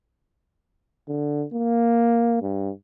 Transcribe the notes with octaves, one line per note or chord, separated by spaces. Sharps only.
D3
A#3
G2